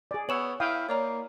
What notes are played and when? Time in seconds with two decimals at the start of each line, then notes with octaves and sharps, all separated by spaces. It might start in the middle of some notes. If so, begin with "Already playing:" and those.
0.11 G#4 D5
0.29 B3 C#5 E6 E7 F#7
0.60 E4 F5 G5 D#6
0.89 A#3 C#5 D5 A#5